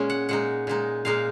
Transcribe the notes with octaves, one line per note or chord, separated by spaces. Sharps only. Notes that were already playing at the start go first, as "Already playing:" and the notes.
Already playing: A#2 G#3 C#4 C#5
F#5
A#2 G#3 D#4 F#5
A#2 G#3 D#4
A#2 G#3 D#4 F5